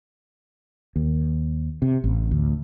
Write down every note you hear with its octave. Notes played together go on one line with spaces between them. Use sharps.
D#2
C3
A1
D2